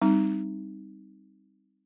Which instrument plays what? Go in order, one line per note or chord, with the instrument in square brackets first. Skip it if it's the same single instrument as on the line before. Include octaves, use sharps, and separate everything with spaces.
[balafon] G3 C4 D#4